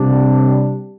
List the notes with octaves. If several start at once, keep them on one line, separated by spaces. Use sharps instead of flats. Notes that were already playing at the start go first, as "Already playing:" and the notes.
Already playing: C3 G3 D4